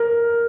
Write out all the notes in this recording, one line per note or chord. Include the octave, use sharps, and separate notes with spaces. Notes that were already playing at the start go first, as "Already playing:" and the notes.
Already playing: A#4